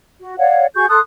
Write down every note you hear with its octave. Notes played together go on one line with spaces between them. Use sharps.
F#4
C#5 D5 F5 F#5
F#4 G#4 C#6 G6
A4 C6 D#6 F#6